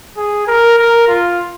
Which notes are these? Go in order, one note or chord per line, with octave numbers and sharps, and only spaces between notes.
G#4
A#4
A#4
F4